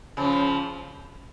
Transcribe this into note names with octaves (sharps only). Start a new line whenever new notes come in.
C#3 F3